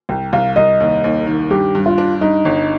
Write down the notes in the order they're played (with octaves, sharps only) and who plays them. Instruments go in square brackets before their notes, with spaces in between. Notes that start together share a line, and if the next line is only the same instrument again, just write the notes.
[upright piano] C2 [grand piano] G5
[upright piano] C2 [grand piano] F5
[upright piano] C2 [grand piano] D#5
[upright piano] D#2
D#2
D#3
[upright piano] G2 [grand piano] G4
[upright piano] G2
[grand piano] F4
[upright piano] D4
[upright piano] G2 [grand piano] D#4
[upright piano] G1